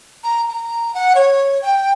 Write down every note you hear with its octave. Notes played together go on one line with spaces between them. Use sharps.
A#5
A#5
F#5
C#5
G5